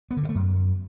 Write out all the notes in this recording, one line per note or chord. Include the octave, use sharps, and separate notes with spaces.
B3
D3
G2
A3
F#2